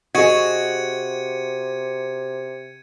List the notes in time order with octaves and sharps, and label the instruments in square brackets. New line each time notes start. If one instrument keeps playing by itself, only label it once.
[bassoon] C3 [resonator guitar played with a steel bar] F#4 [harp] G#4 D#5 [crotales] G#6 C#7 D#7